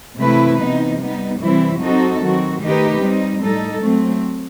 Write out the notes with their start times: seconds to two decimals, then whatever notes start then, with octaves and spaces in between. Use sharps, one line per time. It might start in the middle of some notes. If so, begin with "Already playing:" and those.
0.19 C3 E3 A3 E4 B4
0.60 C3 E3 B3 D#4
1.00 G3 B3 D#4
1.41 C3 E3 G3 C4 E4
1.80 F#3 C4 D#4 F#4 A4
2.20 D#3 F#3 C4 F#4
2.61 D#3 A3 D#4 G4 B4
3.02 G3 C4 D#4
3.41 A2 G3 D#4 A4
3.82 F#3 A3 C4